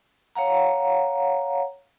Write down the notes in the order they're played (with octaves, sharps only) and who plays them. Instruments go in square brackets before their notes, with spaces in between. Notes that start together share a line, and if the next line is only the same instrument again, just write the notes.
[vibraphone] C#5 F5 F#5 A#5